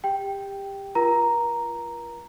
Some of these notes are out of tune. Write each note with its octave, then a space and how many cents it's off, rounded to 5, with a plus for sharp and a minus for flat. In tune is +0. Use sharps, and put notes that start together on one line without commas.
G4 +20 G5 +0
F4 -30 A#4 +40 A#5 +0